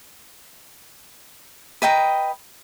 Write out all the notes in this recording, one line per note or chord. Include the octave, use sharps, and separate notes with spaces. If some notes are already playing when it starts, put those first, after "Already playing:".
B4 D#5 G5 A#5